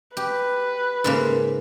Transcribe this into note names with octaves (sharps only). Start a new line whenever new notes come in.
G4 B4
G#2 C#3 A#3